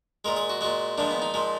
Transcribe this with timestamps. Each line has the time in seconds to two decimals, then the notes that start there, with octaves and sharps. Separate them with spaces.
0.25 A#2 G#3 A#4
0.37 G#4
0.50 F#4
0.61 A#2 G#3 F#4
0.98 A#2 F3 G#3 D4
1.11 B3
1.22 D#4
1.34 A#2 F3 G#3